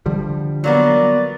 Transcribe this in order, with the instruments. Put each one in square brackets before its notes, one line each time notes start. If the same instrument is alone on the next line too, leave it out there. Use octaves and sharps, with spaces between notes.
[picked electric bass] D3 F3 G3
[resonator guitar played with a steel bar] F#3 A#3 B3 [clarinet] D5